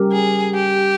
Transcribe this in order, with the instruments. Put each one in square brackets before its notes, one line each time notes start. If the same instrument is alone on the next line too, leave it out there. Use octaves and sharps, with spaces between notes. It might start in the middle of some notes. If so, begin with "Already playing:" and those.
Already playing: [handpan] G3 C#4 G4 A#4
[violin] G#4
G4